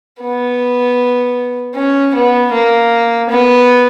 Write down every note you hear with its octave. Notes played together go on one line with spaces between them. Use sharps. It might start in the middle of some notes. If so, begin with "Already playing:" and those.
B3
C#4
B3
A#3
B3